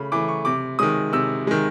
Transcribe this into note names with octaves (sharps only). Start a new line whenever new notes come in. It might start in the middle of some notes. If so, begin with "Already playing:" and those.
Already playing: C#3 A3 B5
E3 A3 D6
C#6
C3 D6
D#3 G#3 D#6
C3 E6
D#3 G#3